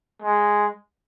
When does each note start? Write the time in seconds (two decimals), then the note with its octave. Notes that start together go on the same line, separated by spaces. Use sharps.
0.22 G#3